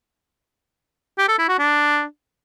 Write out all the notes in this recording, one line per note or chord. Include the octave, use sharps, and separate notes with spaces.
G4
A4
E4
F#4
D4